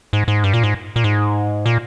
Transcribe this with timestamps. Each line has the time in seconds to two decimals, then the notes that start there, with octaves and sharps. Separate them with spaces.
0.13 G#2
0.28 G#2
0.44 G2
0.54 A#2
0.63 G#2
0.96 A#2
1.04 G#2
1.66 A#2